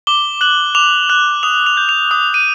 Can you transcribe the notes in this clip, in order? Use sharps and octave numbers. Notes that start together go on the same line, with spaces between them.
D6 G7
F#6 F#7
D6 F7
F#6
D#6 F7
F7
G6
F7
D#6 F7
D#7